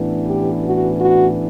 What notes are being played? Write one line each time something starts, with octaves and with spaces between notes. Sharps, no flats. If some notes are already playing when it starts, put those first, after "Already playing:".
Already playing: A1 A2 E3 B3 D4
G4
F#4
F#4